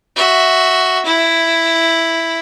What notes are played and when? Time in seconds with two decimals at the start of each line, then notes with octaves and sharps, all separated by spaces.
0.16 F#4 E5
1.06 E4